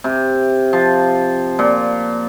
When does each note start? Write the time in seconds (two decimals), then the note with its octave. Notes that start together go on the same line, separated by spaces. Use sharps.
0.04 C3
0.73 F3
1.59 A#2